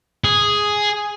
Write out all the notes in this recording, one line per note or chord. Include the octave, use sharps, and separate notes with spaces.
G#4